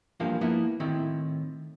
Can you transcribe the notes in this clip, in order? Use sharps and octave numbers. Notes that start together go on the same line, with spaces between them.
E2 G2 F3 A#3 F5
F3 A#3 B3 E4
A2 D#3 C4 E4